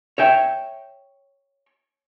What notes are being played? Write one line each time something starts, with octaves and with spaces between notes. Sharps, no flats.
C#5 E5 G5